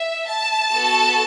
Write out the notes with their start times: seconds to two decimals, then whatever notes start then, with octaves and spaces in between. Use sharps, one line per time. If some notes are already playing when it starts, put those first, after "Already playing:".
Already playing: E5
0.28 A5
0.71 B3 F#4 A4